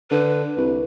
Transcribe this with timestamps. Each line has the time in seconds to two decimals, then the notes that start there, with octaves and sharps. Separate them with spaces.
0.11 D3 B4
0.57 C2